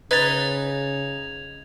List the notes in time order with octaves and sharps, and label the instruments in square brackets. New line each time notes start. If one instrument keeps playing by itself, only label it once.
[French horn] C#3 [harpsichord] D#4 [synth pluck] B4 A6 [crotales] G#6 F7